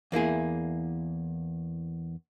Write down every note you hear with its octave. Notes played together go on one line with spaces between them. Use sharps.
E2 A#3 E4 G#4